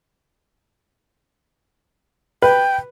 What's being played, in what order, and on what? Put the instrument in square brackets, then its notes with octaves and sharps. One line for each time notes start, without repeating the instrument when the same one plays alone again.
[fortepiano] B4 [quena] G5